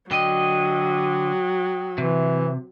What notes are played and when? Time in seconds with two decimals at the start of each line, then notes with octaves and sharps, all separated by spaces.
0.11 D3 F#3 D#5 G5 D#6
1.98 C3 E3